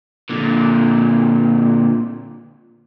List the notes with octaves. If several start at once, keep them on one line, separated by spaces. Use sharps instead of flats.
A#2 D3